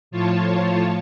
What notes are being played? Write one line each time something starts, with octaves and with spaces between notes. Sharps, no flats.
A2 F3 F4 C#5 A5